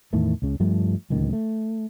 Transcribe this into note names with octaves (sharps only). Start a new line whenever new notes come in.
E2 A2 D#3 A3
C#2 C#3
G2 F3 G3 A3
D1 C#2 D#3
A3